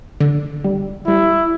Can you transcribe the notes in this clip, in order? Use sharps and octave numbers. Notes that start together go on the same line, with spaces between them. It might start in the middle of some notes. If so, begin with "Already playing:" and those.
D3
G3
G3 E4